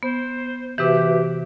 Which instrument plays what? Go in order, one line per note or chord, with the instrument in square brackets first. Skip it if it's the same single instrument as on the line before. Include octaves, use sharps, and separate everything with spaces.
[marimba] B3 [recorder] C5
[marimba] C3 E3 [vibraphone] F#4 B4 E5 [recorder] G4